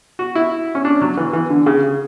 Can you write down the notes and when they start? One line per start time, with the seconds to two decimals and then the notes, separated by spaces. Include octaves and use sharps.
0.19 F#4
0.35 E4
0.75 C#4
0.85 D4
1.02 F#3
1.17 E3
1.33 E3
1.50 D3
1.66 C#3